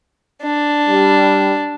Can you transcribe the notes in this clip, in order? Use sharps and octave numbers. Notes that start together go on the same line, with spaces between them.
D4
G3